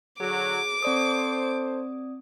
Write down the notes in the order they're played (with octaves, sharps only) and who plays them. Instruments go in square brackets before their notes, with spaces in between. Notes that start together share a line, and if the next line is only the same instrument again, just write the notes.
[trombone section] D3 F#3 [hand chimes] G#4 [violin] D6
[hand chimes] C4 D5 D#6 [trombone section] A4 C5